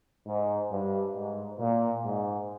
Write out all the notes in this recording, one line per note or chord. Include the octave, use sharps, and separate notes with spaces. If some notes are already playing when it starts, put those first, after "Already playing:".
G#2
G2
G#2
A#2
G#2